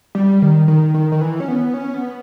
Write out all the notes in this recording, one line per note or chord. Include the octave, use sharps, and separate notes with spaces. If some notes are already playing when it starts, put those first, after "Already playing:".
G3
D#3
D#3
D#3
D#3
E3
C#4
B3
C#4
B3